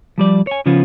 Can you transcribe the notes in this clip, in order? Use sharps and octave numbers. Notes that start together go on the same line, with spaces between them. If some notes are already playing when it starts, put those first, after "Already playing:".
F3 G3 D5
C#5 G#5
C#3 F3 B3 C#4 F4